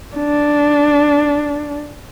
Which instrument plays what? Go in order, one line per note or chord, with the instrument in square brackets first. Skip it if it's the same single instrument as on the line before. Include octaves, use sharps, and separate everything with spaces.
[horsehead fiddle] D4